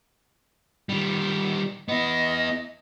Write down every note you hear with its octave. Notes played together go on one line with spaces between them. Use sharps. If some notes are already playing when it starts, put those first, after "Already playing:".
D#3 G3
B3 E4 D#5